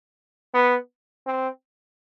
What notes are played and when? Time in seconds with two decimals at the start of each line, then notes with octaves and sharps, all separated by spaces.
0.54 B3
1.27 C4